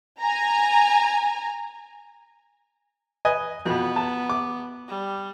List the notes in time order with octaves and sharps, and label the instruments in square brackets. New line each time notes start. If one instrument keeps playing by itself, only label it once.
[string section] G#5 A#5
[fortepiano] B4 D#5 G#5
[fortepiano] F2 B2 [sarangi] B3
[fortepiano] A5
D6
[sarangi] G3